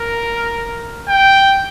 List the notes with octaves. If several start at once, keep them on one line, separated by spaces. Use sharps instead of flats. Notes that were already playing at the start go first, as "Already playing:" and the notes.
Already playing: A#4
G5